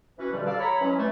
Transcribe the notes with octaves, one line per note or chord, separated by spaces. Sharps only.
E3 C#4 F#4 B4
G2 B2 D3 F3 G3
A4 D5 F5
C#5 A#5 B5
E3 F#3 G#3 C#4
E3 G3 A3